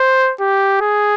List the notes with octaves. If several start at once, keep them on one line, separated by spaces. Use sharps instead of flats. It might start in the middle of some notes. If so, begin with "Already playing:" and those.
Already playing: C5
G4
G#4